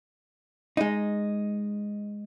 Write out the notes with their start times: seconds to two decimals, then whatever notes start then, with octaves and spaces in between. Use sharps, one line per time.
0.77 G#3 D#4